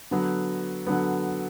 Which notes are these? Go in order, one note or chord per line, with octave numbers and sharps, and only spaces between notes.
D3 F#3 B3
D3 F#3 B3